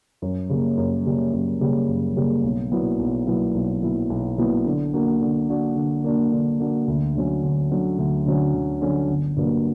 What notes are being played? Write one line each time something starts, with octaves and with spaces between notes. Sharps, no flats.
F#2
C#3 G3 A#3
F#2
C#3 G3 A#3
F#2
C#3 G3 A#3
F#2
C#3 G3 A#3
B1
A#2 F#3 B3 E4
B1
A#2 F#3 B3 E4
B1
A#2 F#3 B3 E4
B1
A#2 F#3 B3 E4
D3
A#3 D4 F#4
D3
A#3 D4 F#4
D3
A#3 D4 F#4
D3
A#3 D4 F#4
D2
D3 F#3 C#4
D2
D3 F#3 C#4
D2
D3 F#3 C#4
D2
D3 F#3 C#4
G1
G2 F#3 A#3